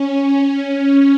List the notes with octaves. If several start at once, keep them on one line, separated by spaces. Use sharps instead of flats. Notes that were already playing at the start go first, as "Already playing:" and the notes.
Already playing: C#4
C#4